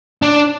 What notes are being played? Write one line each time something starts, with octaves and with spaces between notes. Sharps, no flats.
D4